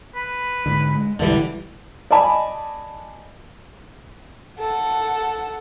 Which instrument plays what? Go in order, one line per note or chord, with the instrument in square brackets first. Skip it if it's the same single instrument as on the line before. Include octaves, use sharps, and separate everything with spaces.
[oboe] B4
[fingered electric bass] G#2 D3
G#3
[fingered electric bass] E1 A1 [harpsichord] D3 E3 G3
[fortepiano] D5 D#5 G#5 A5 B5
[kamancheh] A4 F#5